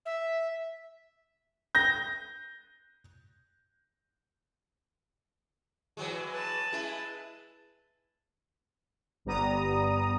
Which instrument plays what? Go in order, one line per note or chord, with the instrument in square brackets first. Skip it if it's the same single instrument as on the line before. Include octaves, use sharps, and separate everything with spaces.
[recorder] E5
[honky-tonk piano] G6 A#6
[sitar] E3 F#3 G#3
[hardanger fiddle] B4 A5
[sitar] G#3 E4
[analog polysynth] G1 G3 B3 A#5 D#6